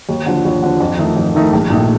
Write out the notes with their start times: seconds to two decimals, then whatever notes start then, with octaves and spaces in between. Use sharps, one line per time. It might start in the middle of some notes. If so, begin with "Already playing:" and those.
0.09 D#2
0.26 D3 F3
0.45 D#2
0.63 D3 F3
0.80 F2
0.98 D#3 A3 D#4
1.17 F2
1.35 D#3 A3 D#4
1.53 A#1
1.70 A#2 A3 D#4